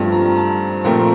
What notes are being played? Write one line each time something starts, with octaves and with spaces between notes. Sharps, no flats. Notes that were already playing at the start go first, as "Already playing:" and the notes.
Already playing: G2 F3 A3 C4
A#5
A5
A#2 F3 A3 C4 A#5